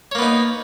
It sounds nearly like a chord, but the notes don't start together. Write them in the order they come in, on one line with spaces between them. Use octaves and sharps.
C#5 A#3 B3 D#4